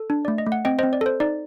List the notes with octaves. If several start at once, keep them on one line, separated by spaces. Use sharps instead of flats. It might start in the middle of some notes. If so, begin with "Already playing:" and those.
Already playing: A4
D4
A3 D5
D#5
A3
F#5
C4 D#5 G5
C5 D#5
C4
D5
A4 C5
D#4 D5